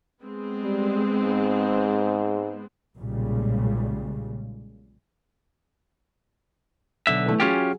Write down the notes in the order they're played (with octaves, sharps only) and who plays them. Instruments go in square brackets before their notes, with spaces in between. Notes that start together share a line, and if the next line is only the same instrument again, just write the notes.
[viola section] G#3 B3 C4
[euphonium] G3
G#2
[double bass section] B1 A#2 C#3 G3 G#3
[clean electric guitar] B1 D3 E5
[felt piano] E3 A3
[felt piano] F#3 G#4 [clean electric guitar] C#4 F4 G4